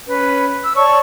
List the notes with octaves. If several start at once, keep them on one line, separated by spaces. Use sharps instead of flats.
C#4 B4
E6
C#5 D5 A5 C#6